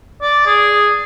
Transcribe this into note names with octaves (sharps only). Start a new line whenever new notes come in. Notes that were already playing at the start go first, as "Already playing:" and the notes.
D5
G#4